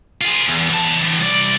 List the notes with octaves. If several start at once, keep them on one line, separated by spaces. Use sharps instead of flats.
F4 G#4
E2
E2 A5
E3 D4
C2 D5